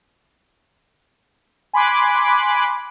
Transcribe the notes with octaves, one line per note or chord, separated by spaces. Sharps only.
G#5 B5 C6 D6 F#6